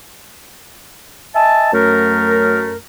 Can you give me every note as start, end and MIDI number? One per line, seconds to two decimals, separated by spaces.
1.34 1.70 75
1.34 1.70 76
1.34 1.70 80
1.34 1.70 81
1.73 2.75 42
1.73 2.75 57
1.73 2.75 70